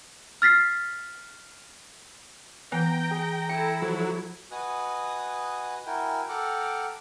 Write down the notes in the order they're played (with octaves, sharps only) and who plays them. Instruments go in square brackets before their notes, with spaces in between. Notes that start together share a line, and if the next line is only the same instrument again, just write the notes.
[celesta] F6 A6 B6 C7
[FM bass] E3 [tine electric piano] B3 [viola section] G5 [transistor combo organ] A#5
[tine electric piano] G#4
[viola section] E4 A4 [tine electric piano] G5 C#7
[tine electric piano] F3 [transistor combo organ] F#3
[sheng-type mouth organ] F#4 B4 D#5 G#5 D#6 F#6
E4 F#4 A#4 G5 G#5
A4 F#5 G5 A#5 D6 F6